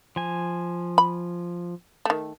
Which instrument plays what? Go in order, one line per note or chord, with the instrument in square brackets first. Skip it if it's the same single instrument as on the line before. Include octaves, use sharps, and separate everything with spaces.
[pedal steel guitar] F3 G#5
[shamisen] B5
D#3 A3